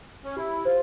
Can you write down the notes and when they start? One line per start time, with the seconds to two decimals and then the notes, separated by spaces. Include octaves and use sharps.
0.24 C#4
0.37 E4 G4
0.65 F4 C5